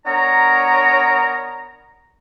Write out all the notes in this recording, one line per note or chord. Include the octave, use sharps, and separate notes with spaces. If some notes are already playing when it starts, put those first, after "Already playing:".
B3 D4 A#4 C#5 A#5